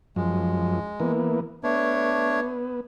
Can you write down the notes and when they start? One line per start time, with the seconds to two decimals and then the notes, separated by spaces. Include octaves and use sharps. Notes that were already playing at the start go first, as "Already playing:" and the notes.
0.16 F#2 F3 G#3
1.00 E3 A#3 B3
1.64 A3 B3 D4 C#5